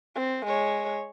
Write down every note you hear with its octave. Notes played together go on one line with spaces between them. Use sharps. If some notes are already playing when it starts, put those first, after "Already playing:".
C4
G#3 C#5